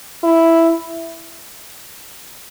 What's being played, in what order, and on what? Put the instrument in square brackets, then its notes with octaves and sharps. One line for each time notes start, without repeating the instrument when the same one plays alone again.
[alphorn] E4